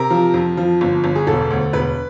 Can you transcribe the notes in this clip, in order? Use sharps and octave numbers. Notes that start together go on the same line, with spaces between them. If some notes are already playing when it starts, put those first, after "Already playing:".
Already playing: C3 A#4
F3
F2
F3
G1
G1
G#4
E1 A4
D2
E1 B4